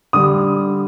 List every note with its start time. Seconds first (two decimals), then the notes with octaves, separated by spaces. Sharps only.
0.13 D3 G3 D#6